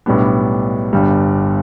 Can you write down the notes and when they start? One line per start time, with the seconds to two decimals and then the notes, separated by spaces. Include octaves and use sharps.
0.06 B1 A2 G3 B3 D4
0.93 G1 G2 G3